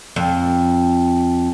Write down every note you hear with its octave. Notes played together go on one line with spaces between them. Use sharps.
F2